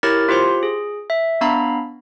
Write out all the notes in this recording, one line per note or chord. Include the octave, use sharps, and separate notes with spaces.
E4 G4 A#4 C#5 F6 A6
F4 G4 C5 C6
G#4
E5
B3 D4 F5 A#5 B5